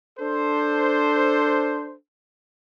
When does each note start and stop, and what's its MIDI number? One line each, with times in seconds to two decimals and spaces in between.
0.19 1.95 62
0.19 1.95 69
0.19 1.95 72